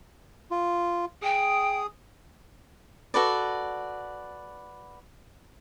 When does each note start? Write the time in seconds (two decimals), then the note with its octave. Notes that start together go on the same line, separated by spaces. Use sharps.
0.51 F4
1.22 G#4 G5 D#6
3.14 F#4 A4 B4 D5